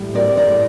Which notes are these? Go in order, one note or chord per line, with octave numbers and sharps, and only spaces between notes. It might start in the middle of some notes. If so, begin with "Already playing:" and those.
Already playing: A2 G3
C4 A#4 D5
A#4 D5
A2